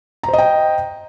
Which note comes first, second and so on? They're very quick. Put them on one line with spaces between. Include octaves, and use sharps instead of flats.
A#5 C5 D#5 G5